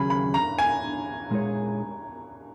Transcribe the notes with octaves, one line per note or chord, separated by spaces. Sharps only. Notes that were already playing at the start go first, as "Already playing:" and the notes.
Already playing: D#2 C#3 F#3 C#4 G#4 B5
B5
A#5
G#5
A#2 G#3 D#4 G#4 C#5